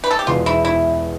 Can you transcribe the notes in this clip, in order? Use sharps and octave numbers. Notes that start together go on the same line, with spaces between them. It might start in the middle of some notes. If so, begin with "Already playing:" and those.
B4
A4
G4
E1 E2 B2 B3 F4
E4
E4